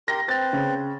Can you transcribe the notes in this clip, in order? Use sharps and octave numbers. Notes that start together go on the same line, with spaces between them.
G4 A#4 C6 A#6
C4 B4 C5 A6
C#3